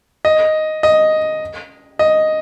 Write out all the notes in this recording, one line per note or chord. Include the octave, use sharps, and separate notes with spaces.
D#5
D#5
D#5